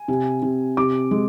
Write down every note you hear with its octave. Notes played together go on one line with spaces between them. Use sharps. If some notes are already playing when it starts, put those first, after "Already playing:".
Already playing: G#5
C3
C3
C3 D6
G#3